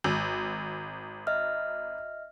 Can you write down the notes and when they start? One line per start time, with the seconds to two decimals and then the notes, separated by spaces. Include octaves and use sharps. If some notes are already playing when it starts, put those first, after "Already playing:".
0.04 G#1 E6
1.27 D#5 E5 F6